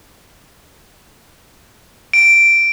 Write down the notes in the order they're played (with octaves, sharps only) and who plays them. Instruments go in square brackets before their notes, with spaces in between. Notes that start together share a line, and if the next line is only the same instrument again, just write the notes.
[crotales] D7